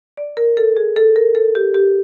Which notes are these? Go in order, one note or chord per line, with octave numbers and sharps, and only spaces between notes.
D5
A#4
A4
G#4
A4
A#4
A4
G4
G4